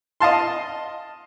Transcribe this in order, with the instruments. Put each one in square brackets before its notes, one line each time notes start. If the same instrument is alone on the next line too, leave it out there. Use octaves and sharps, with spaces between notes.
[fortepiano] D#5 F5 A5 C6